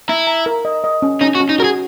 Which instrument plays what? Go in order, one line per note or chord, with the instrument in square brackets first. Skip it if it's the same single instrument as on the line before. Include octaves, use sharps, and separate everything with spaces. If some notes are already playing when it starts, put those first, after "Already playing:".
[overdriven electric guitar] E4 [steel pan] A#5
[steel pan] A#5
A#4
D#5
D#5
C#4
[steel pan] C#4 [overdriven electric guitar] D#4
[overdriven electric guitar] F#4
[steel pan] C#4
[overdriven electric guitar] D#4
[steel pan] F#4 [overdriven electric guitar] A#4
[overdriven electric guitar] G#4